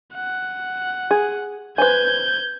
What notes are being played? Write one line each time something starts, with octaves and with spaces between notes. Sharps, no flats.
F#5
G#4
B4 C5 G#5 G6 G#6